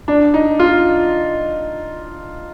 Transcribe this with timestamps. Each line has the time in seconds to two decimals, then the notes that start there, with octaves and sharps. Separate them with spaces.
0.08 D4
0.34 D#4
0.59 F4